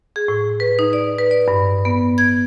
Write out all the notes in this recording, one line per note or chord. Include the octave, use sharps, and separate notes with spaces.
G#4
A2
B4
D#4
D5
B4
D5
G2
B3
G#6